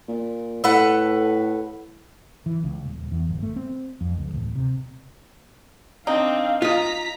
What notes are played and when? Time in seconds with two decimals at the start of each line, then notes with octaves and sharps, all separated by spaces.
0.08 A#2
0.64 A2 A4 B4 F#5
2.46 E3
2.64 C#2
2.85 D#1
3.12 E2
3.29 G1
3.43 A3
3.56 C4
4.01 F2
4.17 C#2
4.34 D1
4.56 C3
6.07 C4 D4 D#4 F5
6.62 F4 D#5 A#5 B6